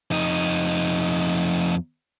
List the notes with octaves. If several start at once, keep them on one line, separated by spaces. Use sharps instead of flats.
F2 D#4